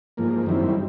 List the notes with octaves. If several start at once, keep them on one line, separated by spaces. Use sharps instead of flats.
G#2 F3 A#3
F#2 D#3 G3 C4 E4